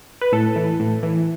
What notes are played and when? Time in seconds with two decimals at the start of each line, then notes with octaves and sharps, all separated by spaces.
0.21 B4
0.32 A2 A4
0.56 E3
0.80 A2
1.03 E3